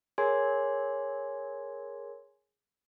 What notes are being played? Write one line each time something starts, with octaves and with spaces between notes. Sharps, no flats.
G#4 A#4 C#5 G#5 C6 G#6